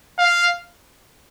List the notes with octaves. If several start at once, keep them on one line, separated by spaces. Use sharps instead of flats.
F5